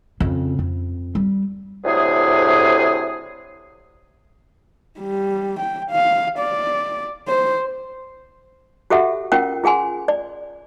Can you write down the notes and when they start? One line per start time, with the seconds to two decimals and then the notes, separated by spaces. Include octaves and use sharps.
0.20 F2 C#3
0.59 F2
1.15 G3
1.84 D2 A2 C3 G#4
5.00 G3
5.60 G5
5.91 F5
6.39 D5
7.28 C5
8.90 F#4 G4 A4 E5 F#5
9.32 C#4 F4 A#4 F#5 G5
9.64 F4 G#4 F#5 G#5 C6
10.08 D5